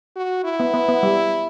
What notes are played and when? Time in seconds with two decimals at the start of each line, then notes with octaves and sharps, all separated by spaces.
0.16 F#4
0.44 E4
0.60 B3
0.74 B3
0.88 B3
1.03 G3